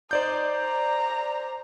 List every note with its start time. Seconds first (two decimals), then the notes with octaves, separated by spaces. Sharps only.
0.11 D#4 C5 D5 G6
0.51 A#5